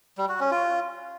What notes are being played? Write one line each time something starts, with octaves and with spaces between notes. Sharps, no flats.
G3
F#4
C#4
F4